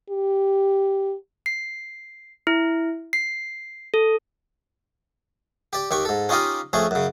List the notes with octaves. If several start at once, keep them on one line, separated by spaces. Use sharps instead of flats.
G4
C7
E4
C7
A4
G4 D5
D#2 G4 C#6
G#2 A4
C#4 D#4 F4 G4 D#5 F5
F2 A3 C#4 G#4
F#2 C#3